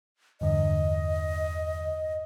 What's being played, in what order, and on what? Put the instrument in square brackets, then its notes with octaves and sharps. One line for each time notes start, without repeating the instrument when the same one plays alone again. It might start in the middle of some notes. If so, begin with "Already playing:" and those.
[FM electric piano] E2 G2 D3 [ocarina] D#5